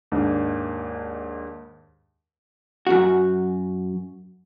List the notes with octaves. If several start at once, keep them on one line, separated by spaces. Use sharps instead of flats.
D#2 G#2 D4
F#2 F#4